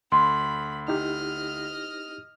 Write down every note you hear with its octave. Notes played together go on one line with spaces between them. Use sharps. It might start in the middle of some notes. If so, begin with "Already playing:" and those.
D2 B5 C6
D#4 E4 G4 D#5 F6